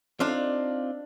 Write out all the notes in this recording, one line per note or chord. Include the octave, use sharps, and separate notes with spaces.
C4 D4 D#4 F4 F5